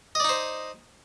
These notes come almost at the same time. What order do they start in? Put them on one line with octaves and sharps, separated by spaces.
D#5 D5 D#4 C5